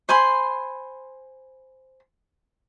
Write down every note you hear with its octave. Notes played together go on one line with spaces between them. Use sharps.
C5 G#5 B5 C6